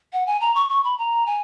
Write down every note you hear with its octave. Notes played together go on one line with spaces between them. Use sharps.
F#5
G#5
A#5
C#6
C#6
B5
A#5
G#5